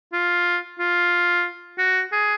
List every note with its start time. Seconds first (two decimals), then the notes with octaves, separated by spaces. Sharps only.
0.13 F4
0.79 F4
1.78 F#4
2.12 G#4